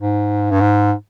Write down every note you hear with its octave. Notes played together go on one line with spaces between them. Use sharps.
G#2
G2
G#2